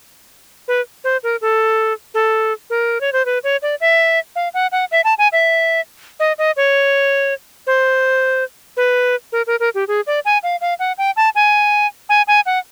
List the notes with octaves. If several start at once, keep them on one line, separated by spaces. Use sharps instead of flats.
B4
C5
A#4
A4
A4
A#4
C#5
C5
B4
C#5
D5
E5
F5
F#5
F#5
E5
A5
G#5
E5
D#5
D#5
C#5
C5
B4
A#4
A#4
A#4
G4
G#4
D5
G#5
F5
F5
F#5
G5
A5
G#5
G#5
G#5
F#5